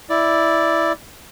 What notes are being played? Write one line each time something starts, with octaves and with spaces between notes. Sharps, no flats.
E4 D5